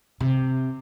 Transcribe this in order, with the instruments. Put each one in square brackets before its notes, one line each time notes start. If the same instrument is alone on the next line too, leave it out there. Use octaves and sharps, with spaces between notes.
[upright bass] C3